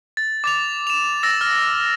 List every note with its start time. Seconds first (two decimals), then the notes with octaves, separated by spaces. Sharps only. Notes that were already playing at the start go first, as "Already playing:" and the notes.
0.17 A6
0.44 D6 A6 F7
0.87 E7 F7
1.23 E6 A6 A#6
1.41 F6